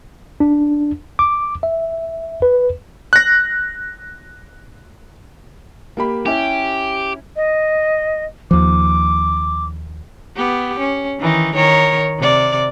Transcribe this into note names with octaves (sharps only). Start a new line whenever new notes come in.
D4
D6
E5
B4
F#6 A#6
A#3 G4 B5
C#4 E4 G4
D#5
D#2 F3 D6
B3 G4
C#4
D#3 E3 D#4
D#3 A#4 C#5
C3 D5